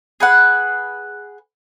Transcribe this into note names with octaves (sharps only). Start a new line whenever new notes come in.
G#4 B4 F#5